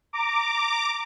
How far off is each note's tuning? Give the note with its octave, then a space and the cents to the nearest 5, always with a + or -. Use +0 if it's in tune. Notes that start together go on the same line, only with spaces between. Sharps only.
A#5 -15 D6 +0